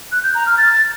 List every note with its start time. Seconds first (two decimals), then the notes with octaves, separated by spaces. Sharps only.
0.12 F#6
0.23 G6
0.35 A#5
0.46 F6
0.58 A6